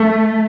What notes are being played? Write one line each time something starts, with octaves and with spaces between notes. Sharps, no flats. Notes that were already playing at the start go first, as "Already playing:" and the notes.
Already playing: A3